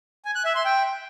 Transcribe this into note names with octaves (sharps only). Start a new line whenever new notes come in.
G#5
F#6
E5
C6
G5